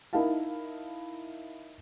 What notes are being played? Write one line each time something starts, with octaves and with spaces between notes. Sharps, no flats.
D#4 E4 A#4 F5 A5